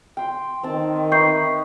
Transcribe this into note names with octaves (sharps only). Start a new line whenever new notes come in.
G5 C6
D#3 C4 A5
D#4 B4 E5 C#6 G6 C7